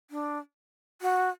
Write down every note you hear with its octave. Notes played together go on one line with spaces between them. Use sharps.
D4
F#4